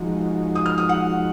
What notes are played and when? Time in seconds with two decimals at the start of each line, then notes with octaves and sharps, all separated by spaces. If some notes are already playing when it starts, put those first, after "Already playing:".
Already playing: F3 G#3 D#4 F#4
0.55 D#6
0.66 F6
0.78 D#6
0.89 F#5